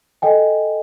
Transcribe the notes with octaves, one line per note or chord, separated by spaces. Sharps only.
A4 D#5 G5 G#5